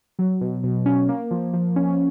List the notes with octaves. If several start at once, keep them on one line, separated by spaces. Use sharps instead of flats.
F#3
B2
B2
C#4
A#3
F3
F3
C#4